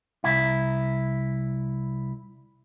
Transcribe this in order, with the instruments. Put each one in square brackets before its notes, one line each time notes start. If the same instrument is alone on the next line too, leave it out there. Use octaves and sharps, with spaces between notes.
[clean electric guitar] C2 E4